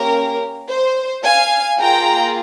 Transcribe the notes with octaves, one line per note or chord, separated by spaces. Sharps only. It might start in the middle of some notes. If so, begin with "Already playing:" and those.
Already playing: A#3 C#4 G4 A#4
C5
F5 G#5
A#3 F4 G#4 G5 A#5